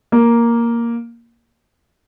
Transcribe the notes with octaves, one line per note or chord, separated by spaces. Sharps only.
A#3